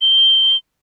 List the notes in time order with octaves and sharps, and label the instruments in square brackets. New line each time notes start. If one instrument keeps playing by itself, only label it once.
[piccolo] G7